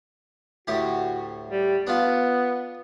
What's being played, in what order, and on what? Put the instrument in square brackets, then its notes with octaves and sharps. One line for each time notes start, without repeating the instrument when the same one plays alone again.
[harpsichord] D2 A2 G4 [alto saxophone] F#4
[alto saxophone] G3
[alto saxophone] B3 [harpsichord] D4 F4